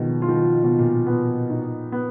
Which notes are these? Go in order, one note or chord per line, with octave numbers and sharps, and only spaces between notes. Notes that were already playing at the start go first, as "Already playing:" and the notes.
Already playing: B2 D#3 F3 G#3
F3 F4
D#3
F3
B2
A#2
B3
D#4
B3